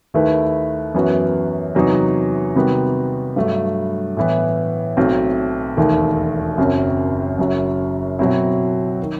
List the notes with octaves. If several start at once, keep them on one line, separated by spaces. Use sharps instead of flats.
D#2 D#3 A3 E4 B4
F#2 E3 B3 F#4
E2 C3 F#3 B3 D#4
C3 D#3 G3 B3 F#4
G2 F#3 A3
A2 E3 B3
B1 B2 A3 C4 F#4
E1 D#2 D#3 A3
F#1 F#2 F#3 C4
F#1 F#2 F#3
B2 F#3 C4 E4
D#3